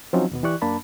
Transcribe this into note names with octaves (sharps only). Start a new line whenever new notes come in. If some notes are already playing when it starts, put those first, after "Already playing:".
F3 F#3 C4 C#4 D#4 F#4
D#2 B2 B3
E3 E4 G4 D5 C#6 F#6
F#2 A#3 D4 A5 B5